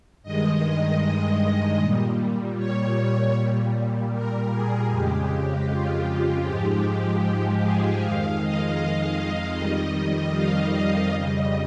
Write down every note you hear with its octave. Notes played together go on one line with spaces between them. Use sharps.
G2 D#3 G#3 D#5
A#2 G3
C#5
A#2 G3
A#4
G#4
F2 C#3 G#3 G4
F4
F4
G#2 F3 G#3 G4
G4
G4
G#4
F2 D#3 G#3 F5
D#5
F5
F2 D#3 G3 D#5
F5
F2 C#3 G3 D#5